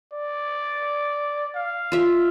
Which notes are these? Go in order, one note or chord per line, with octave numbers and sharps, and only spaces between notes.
D5
F5
F4 E5